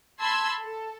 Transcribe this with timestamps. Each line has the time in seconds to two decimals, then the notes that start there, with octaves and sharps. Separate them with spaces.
0.21 A5 B5 C6 E6 G#6
0.61 A4